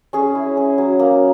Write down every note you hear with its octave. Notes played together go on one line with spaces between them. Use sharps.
C#4 G#4
E4
C#4
F#3
A#3